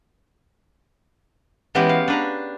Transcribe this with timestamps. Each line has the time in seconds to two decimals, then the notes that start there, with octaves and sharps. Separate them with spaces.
1.75 E3 G#3 B3 C#4 F#4 G4
1.89 F5
2.08 D4 B4 A#5